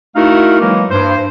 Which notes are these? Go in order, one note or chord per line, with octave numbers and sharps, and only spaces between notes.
A3 D#4 E4 F#4 A#4 F5
E3 F#3 G#3 A#3
G2 C5